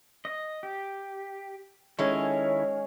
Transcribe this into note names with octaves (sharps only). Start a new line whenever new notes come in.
D#5
G4
D#3 G#3 C#4 E4 A4